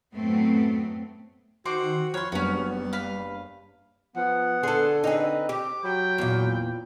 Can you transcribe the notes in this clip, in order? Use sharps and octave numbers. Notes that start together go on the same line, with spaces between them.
F#2 A2 A3 B3 C4
D#3 C4 F#4 C5 D6
F3 C#5 B5 C6 F6 F#6
F#1 G2 G3 B3 C#4 F#4
B4 F5
F3 B3 F#5
D3 G#4 A4 C6
C4 D#4 G#4 B4
G4 D6
F#3 G5 B5
E2 A#2